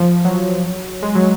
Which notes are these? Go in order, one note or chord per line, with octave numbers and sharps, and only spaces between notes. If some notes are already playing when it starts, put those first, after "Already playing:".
Already playing: F3
F#3
G#3
F#3